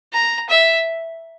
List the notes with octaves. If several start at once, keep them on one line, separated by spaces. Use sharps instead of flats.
A#5
E5